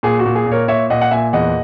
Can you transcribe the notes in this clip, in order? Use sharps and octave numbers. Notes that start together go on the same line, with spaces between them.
A#2 G#4
F#4
A#2
G#4
A#2
A#4 C#5
A#2 C#5 E5
A#2 D#5 F#5
F#5
A#2 E5 G#5
E2 D#5 F#5